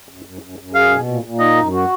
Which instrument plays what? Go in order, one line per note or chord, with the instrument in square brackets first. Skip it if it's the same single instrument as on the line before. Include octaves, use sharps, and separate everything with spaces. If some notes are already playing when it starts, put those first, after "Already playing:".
[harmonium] F#2
F#2
F#2
F#2
[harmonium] G#4 [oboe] F5
[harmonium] B2
A#2
A#2
[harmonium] D#4 [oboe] D#5
[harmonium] F#2
F#4